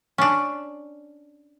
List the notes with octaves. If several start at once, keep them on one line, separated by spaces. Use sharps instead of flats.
C#4 D4